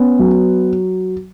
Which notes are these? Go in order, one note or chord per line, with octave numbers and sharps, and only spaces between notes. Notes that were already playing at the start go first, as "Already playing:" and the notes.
Already playing: B3 C#4
F#3